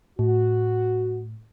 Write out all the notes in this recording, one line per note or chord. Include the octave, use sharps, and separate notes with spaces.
A2 F#4